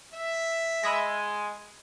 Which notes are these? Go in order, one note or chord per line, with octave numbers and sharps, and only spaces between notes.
E5
G#3 B5 D#6 A#6